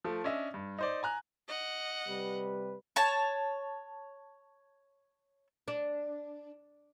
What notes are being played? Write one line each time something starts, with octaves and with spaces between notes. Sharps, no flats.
F3 A3
C#4 D4 D#5 E5
G2
D#4 C5 D5
G#5 A#5 F#6
D#5 F#5
C3 G3 B4
C#5 A5
D4